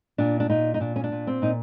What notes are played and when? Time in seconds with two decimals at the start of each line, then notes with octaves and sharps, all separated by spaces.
0.18 A#2 D4
0.40 D4
0.49 A#2 D#4
0.74 D#4
0.80 A#2 D4
0.96 C#4
1.04 D4
1.12 A#2
1.27 C4
1.42 A#2 D#4